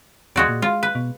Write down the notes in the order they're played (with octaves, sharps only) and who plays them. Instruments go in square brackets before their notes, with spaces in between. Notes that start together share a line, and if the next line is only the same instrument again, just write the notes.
[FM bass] E2 [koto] G#3 F#4 D5
[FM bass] A#2
[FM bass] G#3 [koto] F4
[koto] B4
[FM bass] B2